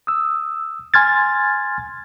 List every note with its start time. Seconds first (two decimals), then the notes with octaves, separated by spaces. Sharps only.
0.07 D#6 E6
0.94 G#5 C6 F6 G#6 A6